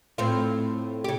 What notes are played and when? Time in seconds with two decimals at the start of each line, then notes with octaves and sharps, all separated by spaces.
0.18 A2 C4 F4
1.04 C#3 G4